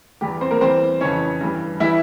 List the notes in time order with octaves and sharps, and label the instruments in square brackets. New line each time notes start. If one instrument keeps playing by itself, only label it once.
[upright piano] E2 E3 G3 G4
C4 C5
A#3 A#4
E2 E3 G3 C4 C5
F2 C#3 E3 C#4 C#5
G2 E3 G3
E3 G3 E4 E5